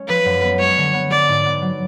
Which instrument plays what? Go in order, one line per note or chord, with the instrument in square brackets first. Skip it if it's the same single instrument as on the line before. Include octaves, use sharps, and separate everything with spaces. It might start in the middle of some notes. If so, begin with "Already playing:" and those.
Already playing: [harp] G#3 C#4
[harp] F3 [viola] B4
[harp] F#2
B3
[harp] G#3 [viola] C#5
[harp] D3
B3
[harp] G#3 [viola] D5
[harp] G#2
B3
F#3